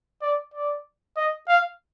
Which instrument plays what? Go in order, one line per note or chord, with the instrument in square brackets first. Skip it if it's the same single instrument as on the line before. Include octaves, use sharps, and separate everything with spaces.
[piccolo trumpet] D5
D5
D#5
F5